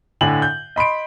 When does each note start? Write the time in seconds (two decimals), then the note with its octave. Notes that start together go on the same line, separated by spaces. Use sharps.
0.21 A2 D3 G#5 F#7
0.42 G6
0.76 D#5 B5 C6 D7